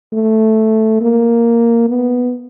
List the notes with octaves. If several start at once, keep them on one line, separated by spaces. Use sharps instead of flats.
A3
A#3
B3